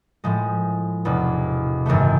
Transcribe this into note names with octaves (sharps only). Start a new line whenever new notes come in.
A2 F3 G#3
E1 E2 C3
G#1 F#2 C#3 E3 A3